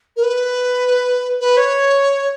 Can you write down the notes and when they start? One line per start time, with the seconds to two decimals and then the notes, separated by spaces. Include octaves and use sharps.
0.16 A#4
0.23 B4
1.40 B4
1.57 C#5